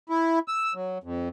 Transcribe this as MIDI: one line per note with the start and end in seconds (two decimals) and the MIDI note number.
0.09 0.39 64
0.48 0.74 88
0.75 0.98 54
1.04 1.29 41